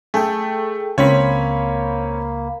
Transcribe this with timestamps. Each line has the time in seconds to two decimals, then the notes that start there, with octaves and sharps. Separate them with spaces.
0.14 A3 G#4 A4 G5
0.98 C#2 A#3 C4 C#4 C#5 B5